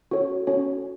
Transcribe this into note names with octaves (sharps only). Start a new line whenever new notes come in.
C#4 F#4 A4 C#5
C#4 F#4 A4 C#5